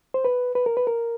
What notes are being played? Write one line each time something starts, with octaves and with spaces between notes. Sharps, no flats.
C5
B4
B4
A#4
B4
A#4